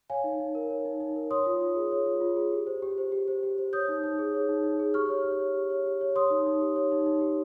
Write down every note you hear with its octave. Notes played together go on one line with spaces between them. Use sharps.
C#5 F5 G#5
D#4
D#4
A#4
C#5
D#4
D#4
A#4
C#5 C6 D#6
F4
F4
G#4
C#5
F4
F4
G#4
G4
C5
G4
C5
G4
C5
G4
C5
C#5 D#6 G6
D#4
D#4
G#4
C#5
D#4
D#4
G#4
G4 C#6 F6
C#5
G4
C#5
G4
C#5
G4
C#5
C#5 C6 D#6
D#4
D#4
G4
C#5
D#4
D#4
G4